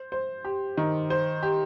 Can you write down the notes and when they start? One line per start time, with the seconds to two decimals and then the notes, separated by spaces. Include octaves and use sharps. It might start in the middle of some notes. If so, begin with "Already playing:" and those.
Already playing: C5
0.12 C5
0.44 G4
0.77 D#3
1.10 C5
1.43 G4